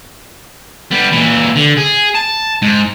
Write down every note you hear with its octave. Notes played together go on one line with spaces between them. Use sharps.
G3 B3
A#2 E3
D3
G#4
A5
G#2